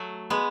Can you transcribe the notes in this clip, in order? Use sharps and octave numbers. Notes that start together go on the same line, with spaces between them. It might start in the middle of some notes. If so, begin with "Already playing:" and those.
Already playing: F#3 A3
G#3 B3